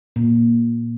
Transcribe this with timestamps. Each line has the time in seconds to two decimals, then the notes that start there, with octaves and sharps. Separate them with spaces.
0.16 A#2